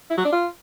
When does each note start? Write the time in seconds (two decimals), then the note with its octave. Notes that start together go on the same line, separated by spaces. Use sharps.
0.10 E4
0.17 F#3
0.25 D4
0.32 F4